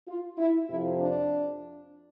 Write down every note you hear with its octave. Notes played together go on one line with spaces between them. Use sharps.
F4
E4
F2 C3 F3 E4
D4